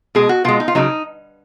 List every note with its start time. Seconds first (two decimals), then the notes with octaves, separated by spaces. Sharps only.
0.15 B2 G#3 G#4
0.29 F#4
0.44 B2 G#3 F4
0.60 D#4
0.68 F4
0.75 C#3 F#3 D#4